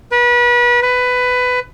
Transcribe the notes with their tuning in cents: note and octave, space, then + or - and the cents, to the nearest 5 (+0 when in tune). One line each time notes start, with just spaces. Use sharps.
B4 -30
B4 +15